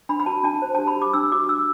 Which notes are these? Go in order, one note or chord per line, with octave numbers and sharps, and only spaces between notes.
D4 B5
B5
F#4 A5
D4 A5
C5
A5
G4
B5
G4
D6
D4 E6
F#4 D6
F#4 E6